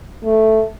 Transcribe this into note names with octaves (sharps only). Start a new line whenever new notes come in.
A3